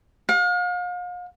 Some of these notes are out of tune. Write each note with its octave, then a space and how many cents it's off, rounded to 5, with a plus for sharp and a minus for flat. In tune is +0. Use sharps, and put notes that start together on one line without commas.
F5 +40